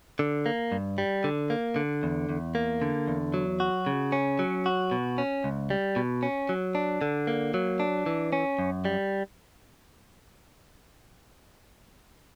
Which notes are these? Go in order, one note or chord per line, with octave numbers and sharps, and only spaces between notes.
D3
A#3
G2
G3
D3
A#3
D3
E2
E2
A#3
D3
E2
F#3
F#4
C#3
C#4
F#3
F#4
B2
C#4
C#2
G3
B2
C#4
F#3
D4
D3
A#3
F#3
D4
E3
C#4
F#2
G3